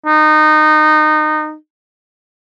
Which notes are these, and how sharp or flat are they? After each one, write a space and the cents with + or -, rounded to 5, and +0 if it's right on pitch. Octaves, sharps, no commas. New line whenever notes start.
D#4 -20